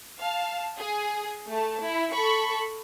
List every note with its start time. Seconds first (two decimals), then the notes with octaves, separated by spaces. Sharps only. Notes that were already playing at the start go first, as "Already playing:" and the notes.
0.19 F5 A5
0.78 G#4
1.47 A3 A5
1.82 E4
2.13 A4 B5 C#6